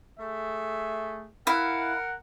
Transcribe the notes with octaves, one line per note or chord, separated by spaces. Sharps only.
A3 G#4 E5
E4 A#4 F5 F#5